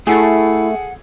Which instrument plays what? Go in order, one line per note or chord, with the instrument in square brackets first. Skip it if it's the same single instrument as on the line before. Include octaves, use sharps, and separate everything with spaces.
[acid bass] A3 [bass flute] E4 [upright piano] G#4 A4 [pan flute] F#5